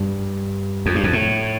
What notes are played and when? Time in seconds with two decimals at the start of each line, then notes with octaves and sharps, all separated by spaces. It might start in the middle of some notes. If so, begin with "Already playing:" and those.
Already playing: G2
0.86 F2
0.95 G2
1.03 F2
1.13 A2